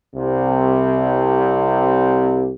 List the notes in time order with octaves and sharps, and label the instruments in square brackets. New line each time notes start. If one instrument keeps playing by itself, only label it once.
[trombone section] C2 C3